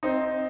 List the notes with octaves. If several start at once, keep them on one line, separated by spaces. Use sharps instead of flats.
C4 D#4